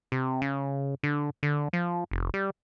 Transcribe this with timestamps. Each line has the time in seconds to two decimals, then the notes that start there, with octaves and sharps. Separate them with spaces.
0.12 C3
0.42 C#3
1.03 D3
1.43 D3
1.73 F3
2.11 F1
2.34 G3